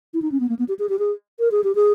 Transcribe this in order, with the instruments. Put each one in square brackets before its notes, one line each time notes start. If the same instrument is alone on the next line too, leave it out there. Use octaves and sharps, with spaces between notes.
[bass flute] E4
D#4
C#4
B3
A#3
B3
G4
G#4
G4
G#4
A#4
G#4
G4
G#4